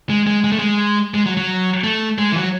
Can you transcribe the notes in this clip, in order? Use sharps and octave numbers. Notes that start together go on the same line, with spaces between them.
G#3
G#3
G#3
A3
G#3
G#3
F#3
F#3
A3
G#3
E3
F#3